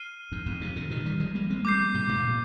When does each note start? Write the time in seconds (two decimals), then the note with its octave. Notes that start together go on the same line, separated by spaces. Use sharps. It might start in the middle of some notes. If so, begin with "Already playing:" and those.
Already playing: F6 C7 D#7 G7
0.32 F2 G#2
0.46 F2 G#2
0.61 G#2 C3
0.76 A#2 D3
0.91 C3 D#3
1.06 D#3 G3
1.20 F3 G#3
1.35 G3 A#3
1.50 G#3 C4
1.65 G3 A#3 D6 G6 C7
1.94 G#2 C3
2.09 G2 A#2